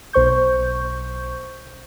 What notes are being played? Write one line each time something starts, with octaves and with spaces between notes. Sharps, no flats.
B1 C5 C#6 G6